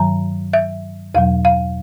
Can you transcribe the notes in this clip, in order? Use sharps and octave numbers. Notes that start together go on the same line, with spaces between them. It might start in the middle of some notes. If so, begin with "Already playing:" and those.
Already playing: G2 D#3 F#3 A#5
E5
E2 B2 F#3 F5
F5